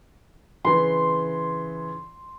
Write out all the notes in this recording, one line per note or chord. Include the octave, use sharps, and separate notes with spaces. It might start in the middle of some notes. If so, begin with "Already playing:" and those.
C#3 E3 C6